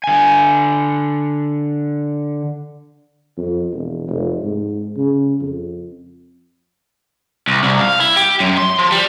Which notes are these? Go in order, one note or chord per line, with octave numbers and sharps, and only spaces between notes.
D3 G#5
F2
E1
F1
G#2
C#3
F2
C2
C2
F5
E4
G4
F#2
C6
F3
G3